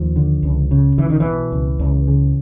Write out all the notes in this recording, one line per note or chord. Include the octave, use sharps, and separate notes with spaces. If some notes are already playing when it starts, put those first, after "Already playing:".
Already playing: D#2 F3
D3
C#2
C#3
B1 E3
D#3
B2 E3
C#2
C#2
C#3